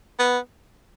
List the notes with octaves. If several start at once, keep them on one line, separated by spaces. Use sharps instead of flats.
B3